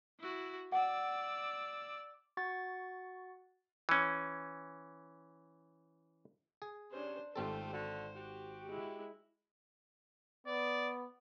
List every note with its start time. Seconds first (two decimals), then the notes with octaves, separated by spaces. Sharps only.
0.20 E4 F#4
0.72 D5 F#5 E6
2.37 F#4 F#5 C#6 A6
3.89 E3 C#4
6.62 G#4
6.92 C3 C#4 D4 C5
7.36 G#1 A3 C4 F4 G4 A4 C5
7.72 D3 F#4
8.15 F#4 G4
8.67 G#3 E4
10.47 B3 D5